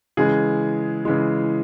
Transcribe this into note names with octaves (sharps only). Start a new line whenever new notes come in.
C#3 E3 G#3 G#4
C#3 E3 G#3